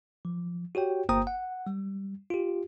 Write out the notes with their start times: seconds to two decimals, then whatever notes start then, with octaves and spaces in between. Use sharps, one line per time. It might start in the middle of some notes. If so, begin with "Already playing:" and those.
0.25 F3
0.75 F#4 G4 C#5 G5
1.09 G1 A#3 C5 G5 A#5 D#6
1.27 F#5
1.67 G3
2.30 F4 G4